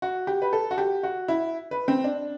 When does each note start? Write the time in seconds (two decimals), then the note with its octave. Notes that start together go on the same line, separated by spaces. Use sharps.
0.02 F#4
0.27 G4
0.42 B4
0.53 A4
0.71 F#4
0.78 G4
1.03 F#4
1.28 E4
1.71 B4
1.88 C4
2.04 D4